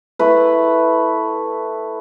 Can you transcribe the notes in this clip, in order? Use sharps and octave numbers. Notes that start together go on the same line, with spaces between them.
A3 E4 B4